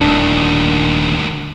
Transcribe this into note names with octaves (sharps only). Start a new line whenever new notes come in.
D#1 D2 D#3 D4